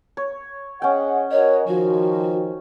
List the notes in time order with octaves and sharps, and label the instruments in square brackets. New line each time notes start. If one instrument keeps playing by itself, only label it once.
[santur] C#5
[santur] C#4 G5 [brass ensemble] G#4 D#5 F#5
[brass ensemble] F#4 A#4 D#5 [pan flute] C#5
[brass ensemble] D#3 F3 [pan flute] F#4